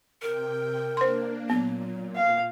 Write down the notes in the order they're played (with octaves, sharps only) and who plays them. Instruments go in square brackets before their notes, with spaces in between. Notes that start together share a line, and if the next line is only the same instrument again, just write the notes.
[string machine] C3 G5 [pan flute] A#4
[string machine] A#3 D4 [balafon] C5 C6
[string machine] A#2 [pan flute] F#3 [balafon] B3
[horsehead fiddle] F5